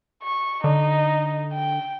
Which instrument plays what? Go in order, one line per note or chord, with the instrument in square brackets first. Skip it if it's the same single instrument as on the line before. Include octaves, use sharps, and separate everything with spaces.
[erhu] C#6
[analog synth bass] D3 [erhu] D#4
[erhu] G5